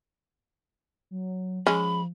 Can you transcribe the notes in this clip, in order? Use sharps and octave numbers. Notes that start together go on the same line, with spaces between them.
F#3
F3 G#3 C#4 B5